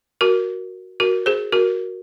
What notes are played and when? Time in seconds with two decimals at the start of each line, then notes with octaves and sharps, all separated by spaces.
0.21 F#4 A#4
1.00 F#4 A#4
1.26 G#4 C5
1.52 F#4 A#4